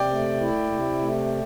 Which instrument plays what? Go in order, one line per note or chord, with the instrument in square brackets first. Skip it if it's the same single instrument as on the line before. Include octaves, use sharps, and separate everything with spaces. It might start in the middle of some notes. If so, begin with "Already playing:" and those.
Already playing: [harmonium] C3 [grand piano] D5 G5
[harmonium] A3
E4
C3
A3